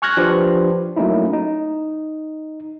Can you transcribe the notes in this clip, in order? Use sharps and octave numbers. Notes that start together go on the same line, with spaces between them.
G#5 C#6 F6 F#6 G#6 A#6
F3 D4 G4 B4 C5 D5
F#3 A3 A#3 C#4 D#4 E4
D#4